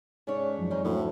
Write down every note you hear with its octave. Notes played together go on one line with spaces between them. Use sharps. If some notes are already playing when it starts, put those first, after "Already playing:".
G#2 A3 C#4 D4 C#5
F#2 F3 F#3
C4 C#4 D#4 G#4
D2 A2 C#4